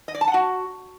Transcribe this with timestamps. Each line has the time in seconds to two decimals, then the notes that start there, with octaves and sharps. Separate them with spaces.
0.08 D#5
0.15 D5
0.21 A5
0.28 F#5
0.34 F#4